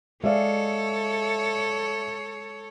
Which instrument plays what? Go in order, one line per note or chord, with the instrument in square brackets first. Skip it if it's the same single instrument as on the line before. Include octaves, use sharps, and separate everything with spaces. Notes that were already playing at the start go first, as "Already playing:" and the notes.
[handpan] G#3 G#4 F5 [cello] A4 C#5 [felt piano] D5 E5